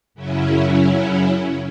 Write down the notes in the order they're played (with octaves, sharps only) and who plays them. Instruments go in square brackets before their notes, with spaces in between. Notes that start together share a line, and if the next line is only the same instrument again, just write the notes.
[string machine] F#2 C#3 F#3 C#4 E4